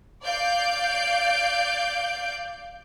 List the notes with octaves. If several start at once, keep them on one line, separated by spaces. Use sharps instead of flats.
D5 F5 G6 D7